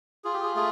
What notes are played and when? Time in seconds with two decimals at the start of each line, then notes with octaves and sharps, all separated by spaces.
0.24 F4 G#4
0.34 G4
0.43 G#4
0.56 A3 G#4